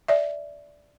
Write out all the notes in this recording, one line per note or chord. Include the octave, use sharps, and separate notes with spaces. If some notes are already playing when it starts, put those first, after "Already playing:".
D5 E5